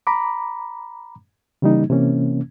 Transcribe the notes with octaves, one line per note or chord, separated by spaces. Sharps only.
A#5 B5 D6
C#3 E3 G3 A#3 D#4
C3 E3 A#3 C#4